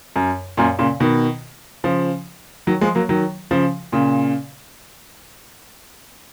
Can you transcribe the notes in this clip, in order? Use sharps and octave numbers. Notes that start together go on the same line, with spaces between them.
F#2
F#2 A#2
A#2 C#3
B2 D#3
C#3 F3
D#3 F#3
F3 G#3
F#3 A#3
D#3 F#3
C#3 F3
A#2 C#3